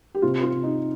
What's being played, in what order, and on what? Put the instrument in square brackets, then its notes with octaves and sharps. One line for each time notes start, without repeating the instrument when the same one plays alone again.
[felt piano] G4
[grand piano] C3 [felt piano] F4
[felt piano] F4
[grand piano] C3
[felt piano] D#4